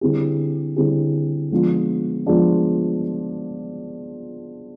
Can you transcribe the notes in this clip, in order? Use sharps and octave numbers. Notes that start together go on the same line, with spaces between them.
D3 G3 C4 E4 G#4
D3 G3 C4 E4 G#4
F3 G#3 B3 D4 F4
F3 G#3 B3 D4 F4